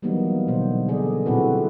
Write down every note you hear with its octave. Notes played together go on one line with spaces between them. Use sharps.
E3 F#3 G3 A#3 B3 D#4
B2 D3 D#4 C5
C#3 G#4 A4 D5 D#5
A#2 C4 E4 F#4 A4 B4